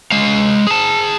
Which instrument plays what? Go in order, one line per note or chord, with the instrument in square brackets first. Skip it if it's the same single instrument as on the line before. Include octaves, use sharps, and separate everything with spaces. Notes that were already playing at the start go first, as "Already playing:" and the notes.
[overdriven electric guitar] G#3 F5
G#4 A5